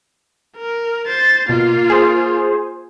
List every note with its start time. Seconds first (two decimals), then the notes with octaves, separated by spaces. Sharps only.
0.57 A#4
1.07 C5 A6
1.49 B2 A#3 F4
1.90 G#4 C5